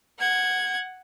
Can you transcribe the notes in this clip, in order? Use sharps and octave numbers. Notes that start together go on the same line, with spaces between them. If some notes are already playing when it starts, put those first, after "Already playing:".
F#5 G#6